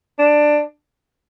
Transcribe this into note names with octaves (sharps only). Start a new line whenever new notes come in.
D4